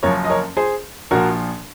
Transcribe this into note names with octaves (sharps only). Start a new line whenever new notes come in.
F#1 F#2 F3 A#4 C#5
D#5
A#4 C#5
G#4 C5
A#1 A#2 F3 F#4 A#4